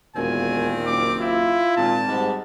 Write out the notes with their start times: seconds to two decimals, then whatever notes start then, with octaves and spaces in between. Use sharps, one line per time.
0.16 E1 D#2 A#2 D#3 C4 G#5
0.87 F#1 D6
1.20 E4 F4
1.77 G#1 A#2 A5
2.08 G#2 B2 G3 G#3